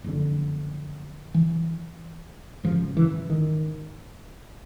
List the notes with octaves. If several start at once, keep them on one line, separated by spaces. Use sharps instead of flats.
F#1 F2 D3
E3
G#1 F#2 C#3 F3
E3
D#3